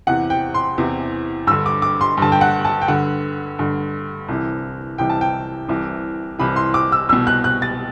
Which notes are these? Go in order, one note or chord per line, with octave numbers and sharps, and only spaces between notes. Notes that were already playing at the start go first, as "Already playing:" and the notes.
E2 C3 E3 F#5
G5
C6
E2 C3 E3
G2 D3 E6
D6
D6
C6
G2 D3 A5
G5
F#5
A5
G5
G2 D3 F#5
G2 D3
C2 C3 E3
C2 C3 E3 G5
A5
G5
C2 C3 E3
C2 C3 E3 B5
C6
D6
E6
C2 B2 E6
F#6
F#6
A6